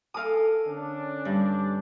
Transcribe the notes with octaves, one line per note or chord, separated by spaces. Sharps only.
A4 A#4 F5 G#5 D#6
D3 C#4 D4
G2